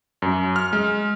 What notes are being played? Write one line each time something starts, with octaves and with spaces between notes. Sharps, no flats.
F#2
F6
G#3